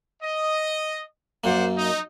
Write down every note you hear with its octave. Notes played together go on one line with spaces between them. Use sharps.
D#5
F#2 A#3 C5 D5 F#5
D#4